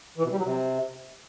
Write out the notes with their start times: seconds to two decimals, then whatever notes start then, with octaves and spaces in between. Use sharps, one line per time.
0.18 E3
0.24 B2
0.31 G3
0.38 F#3
0.45 C3